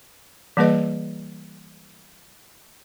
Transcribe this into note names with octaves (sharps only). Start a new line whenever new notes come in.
E3 G3 A#3 G#4 B4 D#5